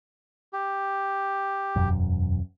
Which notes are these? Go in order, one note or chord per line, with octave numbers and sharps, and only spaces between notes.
G4
E1 F#2